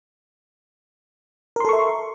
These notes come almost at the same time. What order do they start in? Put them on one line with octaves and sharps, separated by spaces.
A#4 C6 A4 C#6 E5